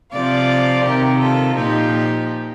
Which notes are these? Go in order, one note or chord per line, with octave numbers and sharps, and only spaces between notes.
C3 F3 D5 F5
C3 D#3 G4 A#4
F4 A4
A#2 F3 D#4 G4